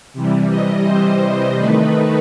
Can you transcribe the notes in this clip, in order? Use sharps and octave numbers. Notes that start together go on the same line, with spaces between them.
C3 E3 G3
D#5
C5
D#3 A3 D#4 B4